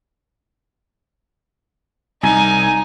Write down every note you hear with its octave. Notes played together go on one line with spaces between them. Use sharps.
C2 D#4 G#5